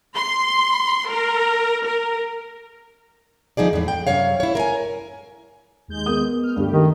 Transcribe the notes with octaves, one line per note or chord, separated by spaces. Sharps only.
C6
A#4
A#4
D2 F3 D#4 G#4 D5
E2 A2
G5
F#2 C3 C#5 F5
E4 C#5
A#4 G#5
D#2 G#3 G6
B3 A#4 D#6
F6
D2 G2 G3 A3 G4
D#3